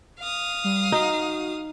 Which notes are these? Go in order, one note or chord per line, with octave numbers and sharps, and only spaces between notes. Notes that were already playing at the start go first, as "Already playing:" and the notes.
F5 D#6
G3
D#4 F#4